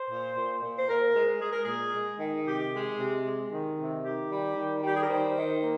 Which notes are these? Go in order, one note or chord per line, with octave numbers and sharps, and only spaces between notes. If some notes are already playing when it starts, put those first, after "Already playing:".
Already playing: C5
A#2
A#2
A#2
C5
A#2 A#4
G#3
G#3 G#4
A#4
A#2 G#4
G#3
D#3
C3 G4
G#3
C3
G#3
D#3
C3
D#3 G4
G3
D#3
G3 G4
G#4
A#4
D#3 C5
D#3
A#3